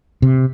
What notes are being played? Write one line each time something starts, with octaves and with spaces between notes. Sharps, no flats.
C3